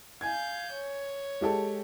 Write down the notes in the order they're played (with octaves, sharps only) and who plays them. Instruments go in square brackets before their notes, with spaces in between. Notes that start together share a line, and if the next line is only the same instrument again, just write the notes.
[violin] F5 G6 [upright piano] G#5 G#6
[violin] C#5
[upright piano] G#3 G4 A4